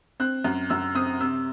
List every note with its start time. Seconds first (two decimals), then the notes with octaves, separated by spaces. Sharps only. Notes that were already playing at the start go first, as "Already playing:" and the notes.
0.20 C4 F#6
0.44 F#2
0.70 F#2 E6
0.95 C4 D#6
1.21 C3 E6